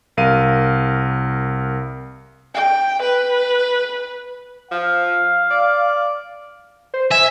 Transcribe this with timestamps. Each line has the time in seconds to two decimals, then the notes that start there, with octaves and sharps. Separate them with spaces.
0.17 C2 A#4 F5 D#7
2.54 G5
3.03 B4
4.71 F3 F5
5.51 D5
6.94 C5
7.11 E5 G#5